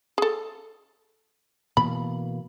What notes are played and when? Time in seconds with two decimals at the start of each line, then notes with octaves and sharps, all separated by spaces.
0.18 G#4 A4
1.77 B2 E3 A#3 B5